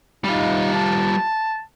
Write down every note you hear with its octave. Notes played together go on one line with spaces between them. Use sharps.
G3 D#4 F4
A5